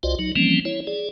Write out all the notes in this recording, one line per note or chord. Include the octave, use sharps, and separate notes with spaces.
C2 F4 F#4 C5 D5 D#5
F#3 D#4
E3 F3 G3 A#3 C4 C#4
E4 C#5
G#4 D5